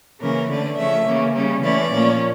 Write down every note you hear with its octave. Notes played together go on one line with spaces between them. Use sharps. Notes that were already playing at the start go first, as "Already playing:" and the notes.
C#3 E3 A#3 C#4 A#4
D3 A3 C#4 D5
C#3 F3 A3 C#4 E5
C#3 E3 A#3 C#4
C#3 G3 C#4
E3 A3 C#4 D5
A#2 F3 A#3 C#4